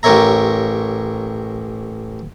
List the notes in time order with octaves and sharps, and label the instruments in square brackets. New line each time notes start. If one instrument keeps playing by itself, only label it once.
[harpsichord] A1 G4 A#4 C#5 E5 A#5